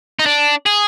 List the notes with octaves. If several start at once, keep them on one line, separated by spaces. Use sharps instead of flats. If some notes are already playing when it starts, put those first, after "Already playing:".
D#4
D4
G#4